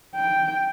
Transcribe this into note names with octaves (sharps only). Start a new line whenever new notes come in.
G5